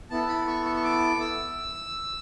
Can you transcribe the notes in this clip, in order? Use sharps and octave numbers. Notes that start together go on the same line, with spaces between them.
B3 E4 A4 A5
B5
C#6
C#6
C#6
D6
E6